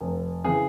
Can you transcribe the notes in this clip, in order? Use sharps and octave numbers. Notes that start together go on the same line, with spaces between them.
F1
C#3 E3 G#4